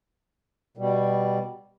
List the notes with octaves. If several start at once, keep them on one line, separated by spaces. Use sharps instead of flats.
B2 G3